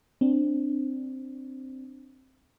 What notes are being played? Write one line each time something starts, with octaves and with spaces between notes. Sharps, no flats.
C4 D4